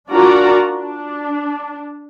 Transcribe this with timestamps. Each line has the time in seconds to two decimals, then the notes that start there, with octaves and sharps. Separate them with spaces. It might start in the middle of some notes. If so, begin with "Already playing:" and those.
0.10 D4 F4 F#4 A#4 D5 A#5
0.73 D4